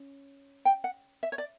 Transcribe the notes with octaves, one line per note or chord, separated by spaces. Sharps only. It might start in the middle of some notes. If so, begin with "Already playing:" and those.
Already playing: C#4
G5
F#5
E5
C#5
D5